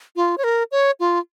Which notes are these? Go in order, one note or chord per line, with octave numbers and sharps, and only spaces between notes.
F4
C#5
A#4
C#5
F4